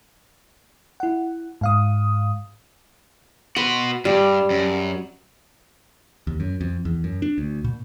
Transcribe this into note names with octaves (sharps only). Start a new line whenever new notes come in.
E4 F#5
G#2 F5 D#6
F#4 B4 C6
G2 G3
F#2
D#2
F#2
F2
E2
F#2
D4
D2
A#2